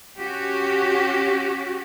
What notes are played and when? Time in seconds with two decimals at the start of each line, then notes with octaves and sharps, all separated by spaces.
0.20 C#4 F#4 G4